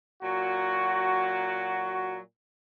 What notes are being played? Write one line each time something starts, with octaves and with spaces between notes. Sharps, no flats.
A#2 F#3 F#4